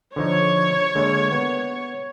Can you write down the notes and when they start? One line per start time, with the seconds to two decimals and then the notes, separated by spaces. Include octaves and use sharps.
0.16 D3 F3 D#4 C#5
0.95 D3 G#3 A#3
1.31 B3